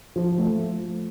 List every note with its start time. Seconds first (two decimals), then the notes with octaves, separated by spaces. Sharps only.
0.16 F3
0.38 A3